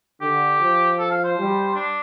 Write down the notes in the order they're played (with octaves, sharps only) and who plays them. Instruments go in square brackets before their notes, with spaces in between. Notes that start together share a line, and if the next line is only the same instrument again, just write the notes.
[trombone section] D3 [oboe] G4
[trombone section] F3
[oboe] A4
F5
C5
[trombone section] G3
[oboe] D4